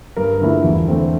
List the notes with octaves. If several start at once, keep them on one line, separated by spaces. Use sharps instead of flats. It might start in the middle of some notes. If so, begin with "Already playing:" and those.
G2 A#4
D3 F3 A3 E4
E2
D3 A3 C4